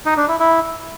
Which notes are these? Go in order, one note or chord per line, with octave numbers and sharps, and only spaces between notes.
D#4
D4
E4
E4